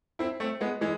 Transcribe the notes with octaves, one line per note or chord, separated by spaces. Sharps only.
C4 E4
A3 C4
G#3 B3
E3 G#3